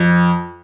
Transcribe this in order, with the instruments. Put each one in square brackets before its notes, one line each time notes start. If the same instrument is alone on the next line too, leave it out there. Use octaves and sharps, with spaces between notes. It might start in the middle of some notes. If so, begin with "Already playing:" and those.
Already playing: [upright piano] F2